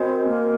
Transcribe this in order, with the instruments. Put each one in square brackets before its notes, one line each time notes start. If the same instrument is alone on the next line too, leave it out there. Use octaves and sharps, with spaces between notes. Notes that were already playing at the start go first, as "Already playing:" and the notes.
Already playing: [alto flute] C4 [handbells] F#4 A#4 D#5 G#5
[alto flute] A#3